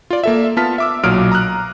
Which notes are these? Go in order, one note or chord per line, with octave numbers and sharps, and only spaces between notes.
F4 D5
A#3 A4 E5
B3 F4 A5 F6 B6
E5 D6 E6
B1 A#2 F#3 D#6 F6 D7
A#5 D#6 F6 F#6